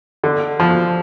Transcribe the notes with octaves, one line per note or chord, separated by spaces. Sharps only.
D3
F3